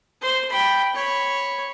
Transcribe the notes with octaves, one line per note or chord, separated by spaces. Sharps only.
C5 C6
G5 B5
C#5 B5